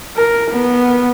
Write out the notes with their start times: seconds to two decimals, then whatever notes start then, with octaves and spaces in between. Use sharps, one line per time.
0.16 A#4
0.51 B3